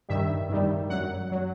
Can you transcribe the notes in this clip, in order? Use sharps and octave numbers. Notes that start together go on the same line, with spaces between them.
G2 D#3 G3 E5
G2 D#3 G3
F#2 F#3 F#5
F#3